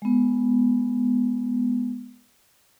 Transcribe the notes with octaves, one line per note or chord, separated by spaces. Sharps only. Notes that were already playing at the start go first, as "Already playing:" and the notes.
G#3 B3